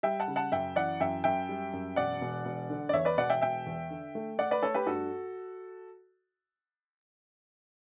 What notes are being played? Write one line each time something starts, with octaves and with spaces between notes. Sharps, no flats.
G3 E5 G5
F#5 A5
C#3
F#5 A5
F#2 E5 G5
E3 D5 F#5
F#2 E5 G5
F#2 E5 G5
G3
F#2
E1 D5 F#5
E1
E1
D3
D5
E2 C#5 E5
B4 D5
E1 D5 F#5
E5 G5
E1 E5 G5
E2
D3
A3
A3 D5 F#5
B4 D5
A3 A4 C#5
G4 B4
G2 F#4 A4